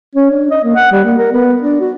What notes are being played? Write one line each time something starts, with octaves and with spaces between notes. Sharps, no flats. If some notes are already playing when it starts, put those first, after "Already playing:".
C#4
D4
D#5
A#3
F#5
G3
A#3
A#4
B3
D4
F#4